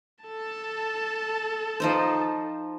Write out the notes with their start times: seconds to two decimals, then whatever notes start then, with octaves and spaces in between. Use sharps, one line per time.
0.24 A4 A5
1.80 F3 D#4 C5